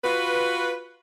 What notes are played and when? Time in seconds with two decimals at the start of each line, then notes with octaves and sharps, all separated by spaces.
0.04 F4 F#4 B4